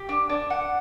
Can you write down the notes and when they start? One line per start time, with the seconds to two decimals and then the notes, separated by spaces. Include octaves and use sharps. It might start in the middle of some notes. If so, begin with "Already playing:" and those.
Already playing: G4
0.09 D4
0.29 D4
0.50 F#5